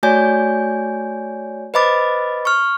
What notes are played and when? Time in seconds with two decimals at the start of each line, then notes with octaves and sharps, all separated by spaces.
0.03 A3 F#4 C#5 D5 G#5 G6
1.74 B4 C5 D#5 B5 D6 A6
2.45 C#6 F6